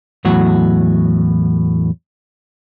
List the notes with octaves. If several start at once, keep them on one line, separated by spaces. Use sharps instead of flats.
E2 A2 F#3 F#4